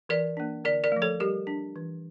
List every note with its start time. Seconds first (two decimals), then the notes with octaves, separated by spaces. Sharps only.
0.09 E3 A#4 D5
0.37 A#3 D4
0.64 D3 A#4 D5
0.84 A#4 D5
0.92 F3 A3
1.02 A4 C#5
1.20 G3 G4 A#4
1.47 D4
1.76 E3